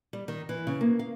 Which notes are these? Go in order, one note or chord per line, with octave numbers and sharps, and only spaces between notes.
G3
D#3
E3
C#3
A#3
F5